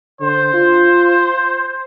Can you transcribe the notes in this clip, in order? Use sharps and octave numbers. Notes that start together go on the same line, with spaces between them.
D3 C5
F4